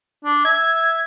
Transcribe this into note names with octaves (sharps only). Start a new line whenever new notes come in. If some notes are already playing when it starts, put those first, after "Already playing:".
D4
E5 G#6